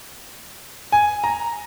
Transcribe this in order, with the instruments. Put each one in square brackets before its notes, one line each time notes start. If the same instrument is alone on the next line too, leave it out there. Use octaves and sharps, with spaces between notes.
[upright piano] G#5
A#5